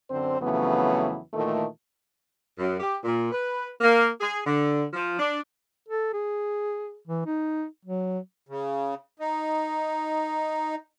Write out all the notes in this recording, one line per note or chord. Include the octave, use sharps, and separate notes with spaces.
F#2 D3 C4 C5
F2 C#3 E3 F#3 A3 B3
A#2 D#3 E3 A3
F#2
G4
A#2
B4
A#3
G#4
D3
F3
D4
A4
G#4
E3
D#4
F#3
C#3
D#4